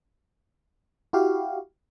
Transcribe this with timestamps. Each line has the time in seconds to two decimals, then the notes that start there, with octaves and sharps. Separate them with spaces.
1.13 E4 F#4 G4 F5